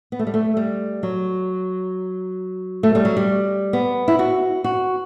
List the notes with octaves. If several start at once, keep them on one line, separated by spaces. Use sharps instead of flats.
B3
A3
G3
A3
G3
F#3
A3
G3
F#3
G3
B3
E4
F#4
F#4